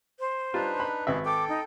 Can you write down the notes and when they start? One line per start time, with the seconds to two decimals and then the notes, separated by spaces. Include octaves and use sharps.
0.20 C5
0.54 G3 D4 D#4 F4 B4
0.80 B5
1.07 G#1 G4 G#4 B4 D#5 E5
1.25 A4 G5 D6
1.49 D#4